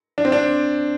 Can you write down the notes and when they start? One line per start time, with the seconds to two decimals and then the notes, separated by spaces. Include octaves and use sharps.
0.18 D4
0.25 C4
0.32 D4